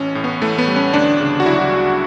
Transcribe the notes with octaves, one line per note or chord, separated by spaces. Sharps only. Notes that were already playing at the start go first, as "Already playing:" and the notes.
Already playing: A1 C#4
A2
B3
E3 A3
B3
G3
C#4
D2 D4
C#3
F#4
F#3 E4
D2